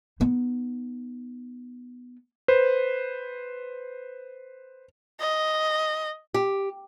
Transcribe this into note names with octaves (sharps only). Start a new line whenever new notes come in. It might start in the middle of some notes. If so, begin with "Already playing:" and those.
B3 D#4
B4 C5
D#5
G4